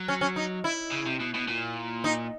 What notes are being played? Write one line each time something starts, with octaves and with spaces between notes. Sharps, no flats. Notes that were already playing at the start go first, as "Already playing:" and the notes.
Already playing: F#3
C#4
C#4
D#4
E4
C#3
C3
B2
B2
A#2
D#4